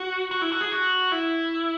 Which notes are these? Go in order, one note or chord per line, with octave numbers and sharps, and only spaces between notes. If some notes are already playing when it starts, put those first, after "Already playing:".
Already playing: F#4
F#4
E4
F#4
G#4
F#4
E4